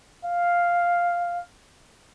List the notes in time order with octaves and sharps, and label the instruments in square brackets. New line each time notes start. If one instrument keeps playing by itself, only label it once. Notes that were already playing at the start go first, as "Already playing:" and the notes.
[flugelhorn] F5